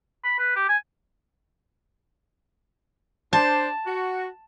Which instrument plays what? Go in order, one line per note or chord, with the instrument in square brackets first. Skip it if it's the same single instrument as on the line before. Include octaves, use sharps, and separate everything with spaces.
[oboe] B5
B4
G4
G#5
[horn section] D4 C5 [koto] A5
[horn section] F#4